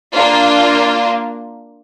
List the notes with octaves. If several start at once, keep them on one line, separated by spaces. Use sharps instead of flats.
A#3 D4 F4